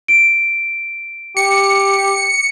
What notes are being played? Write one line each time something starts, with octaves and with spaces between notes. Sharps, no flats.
D7
G4 C#7